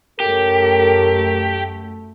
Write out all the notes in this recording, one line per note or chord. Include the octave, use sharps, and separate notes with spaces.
F#2 C#3 A3 G4 A4 A#4